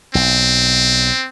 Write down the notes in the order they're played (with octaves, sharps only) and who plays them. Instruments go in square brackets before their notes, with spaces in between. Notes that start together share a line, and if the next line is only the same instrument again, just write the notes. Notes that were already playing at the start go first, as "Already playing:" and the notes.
[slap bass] B1 [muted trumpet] C4